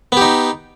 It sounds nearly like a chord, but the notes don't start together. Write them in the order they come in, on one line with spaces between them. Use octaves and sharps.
B3 G4 D#4